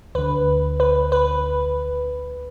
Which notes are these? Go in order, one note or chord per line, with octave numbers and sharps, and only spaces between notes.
D2 D3 B4
B4
B4